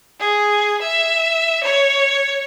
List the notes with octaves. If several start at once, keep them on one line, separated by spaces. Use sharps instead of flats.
G#4
E5
C#5